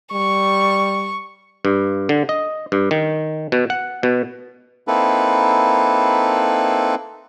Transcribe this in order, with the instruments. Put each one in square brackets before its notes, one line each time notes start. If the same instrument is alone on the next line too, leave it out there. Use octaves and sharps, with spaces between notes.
[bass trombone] G3 [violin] C#6
[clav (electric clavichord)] G2
D3
D#5
G2
D#3
B2
F#5
B2
[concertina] A#3 C4 D#4 E4 A4 B4